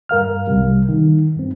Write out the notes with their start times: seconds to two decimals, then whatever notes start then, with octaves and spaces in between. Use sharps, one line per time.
0.09 G2 A#4 F5 F6
0.47 C2 C3 G3
0.89 D#3
1.36 G2 C4